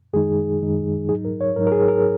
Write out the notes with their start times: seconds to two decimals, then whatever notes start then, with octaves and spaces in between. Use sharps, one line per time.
0.13 F#2 D#3 G#3 D#4 G#4
0.62 F#2 D#3 G#3 D#4
1.09 G#2 F#3 D#4 G#4
1.25 A#4
1.41 C#5
1.56 G#2 F#3 D#4 A#4
1.67 A#4
1.72 G#4
1.88 A#4